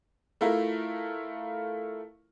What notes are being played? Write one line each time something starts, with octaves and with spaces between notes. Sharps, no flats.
A3 E4 F4 A#4